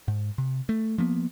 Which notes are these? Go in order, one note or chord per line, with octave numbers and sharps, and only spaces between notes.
G#2
C3
A3
F3 A#3 B3